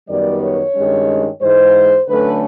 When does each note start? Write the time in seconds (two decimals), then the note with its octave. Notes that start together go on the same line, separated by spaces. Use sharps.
0.09 F#2 D#3 G3 B3 D5
0.42 C#5
0.75 G2 D#3 G#3 C#4
1.42 G#2 E3 G#3 C5
2.07 D3 F#3 A3 C#4 B4